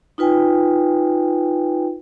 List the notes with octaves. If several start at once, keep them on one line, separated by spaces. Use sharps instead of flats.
D#4 F4 B4 G5 G#5